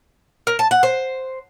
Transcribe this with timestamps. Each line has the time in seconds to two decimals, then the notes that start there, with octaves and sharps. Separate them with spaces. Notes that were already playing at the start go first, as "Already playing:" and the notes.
0.47 A#4
0.59 A5
0.71 F#5
0.83 C5